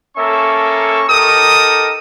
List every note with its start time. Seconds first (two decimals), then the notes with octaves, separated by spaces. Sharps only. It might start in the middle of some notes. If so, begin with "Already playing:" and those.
0.17 A#3 C#4 A4 E5 C#6
1.08 D#4 G4 A4 A#4 D#6